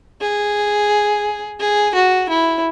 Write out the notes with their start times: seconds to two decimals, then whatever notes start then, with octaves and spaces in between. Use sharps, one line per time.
0.21 G#4
1.60 G#4
1.95 F#4
2.29 E4